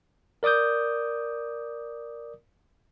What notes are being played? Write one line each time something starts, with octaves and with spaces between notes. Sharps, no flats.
A#4 D5 D6 D#6 G6